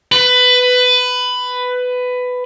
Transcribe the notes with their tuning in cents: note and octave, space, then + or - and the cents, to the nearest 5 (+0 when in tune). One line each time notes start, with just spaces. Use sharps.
B4 +15